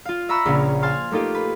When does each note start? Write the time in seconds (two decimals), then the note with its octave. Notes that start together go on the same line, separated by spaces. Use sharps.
0.05 F4 F5
0.29 E5 A#5 B5 C#6 E6 F#6
0.45 A#1 C#3 C#4 F5
0.82 F5 G#5 A5 C6 F6
1.11 A3 A#3 D#4 F4 G4
1.35 B4